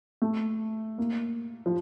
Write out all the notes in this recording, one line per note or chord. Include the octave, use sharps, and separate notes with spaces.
A3
A#3
F3